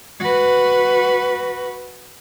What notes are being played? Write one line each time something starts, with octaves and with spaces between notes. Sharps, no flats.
F#4 B4